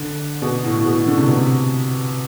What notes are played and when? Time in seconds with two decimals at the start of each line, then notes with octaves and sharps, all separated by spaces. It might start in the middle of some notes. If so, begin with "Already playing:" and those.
Already playing: D3
0.42 B2
0.64 A2
0.85 B2
1.07 D3
1.18 C3
1.27 B2
1.37 C3